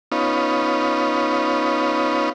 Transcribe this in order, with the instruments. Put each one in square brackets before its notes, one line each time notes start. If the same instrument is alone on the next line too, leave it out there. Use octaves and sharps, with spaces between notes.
[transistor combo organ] B3 C#4 D#4 F4